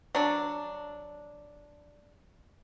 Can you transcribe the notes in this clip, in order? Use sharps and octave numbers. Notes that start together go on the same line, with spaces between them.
F#3 D4